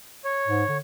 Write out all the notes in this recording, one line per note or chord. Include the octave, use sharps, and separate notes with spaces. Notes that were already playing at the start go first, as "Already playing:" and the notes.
C#5
G#2
D3